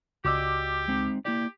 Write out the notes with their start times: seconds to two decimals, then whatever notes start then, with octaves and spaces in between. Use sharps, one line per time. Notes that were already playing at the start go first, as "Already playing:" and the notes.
0.25 C#2 F#4 G4 D5 D#5 D6 E6
0.88 G#3 C4 D#4
1.25 A#3 E4 G4 D5